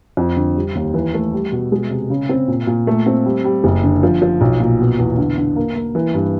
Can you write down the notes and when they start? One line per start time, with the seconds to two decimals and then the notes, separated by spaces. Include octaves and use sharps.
0.17 F2
0.37 D3
0.56 G3
0.75 D#2
0.94 E3
1.14 A3
1.33 G3
1.52 B2
1.72 G#3
1.90 C3
2.10 C#3
2.29 C4
2.48 A#2
2.67 A#2
2.87 A3
3.06 C4
3.25 G3
3.44 G3
3.64 F#1
3.84 D3
4.03 F3
4.22 F3
4.41 B1
4.60 A#2
4.80 B2
4.98 E2
5.18 D3
5.38 D3
5.56 A#3
5.75 A#3
5.95 E3
6.14 G2